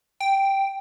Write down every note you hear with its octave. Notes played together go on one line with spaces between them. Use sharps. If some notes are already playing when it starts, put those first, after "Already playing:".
G5